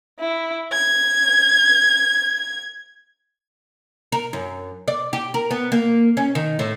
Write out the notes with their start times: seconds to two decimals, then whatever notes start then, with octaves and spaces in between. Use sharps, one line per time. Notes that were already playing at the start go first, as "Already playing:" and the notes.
0.19 E4
0.72 G#6
4.12 A#4
4.33 F#2
4.88 D5
5.13 G4
5.34 A#4
5.51 B3
5.72 A#3
6.17 C#4
6.35 D#3
6.59 A2